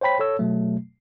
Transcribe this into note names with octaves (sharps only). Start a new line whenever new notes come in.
C5 C#5 G5 B5 B6
A4 C#5 E6
B2 F#3 A3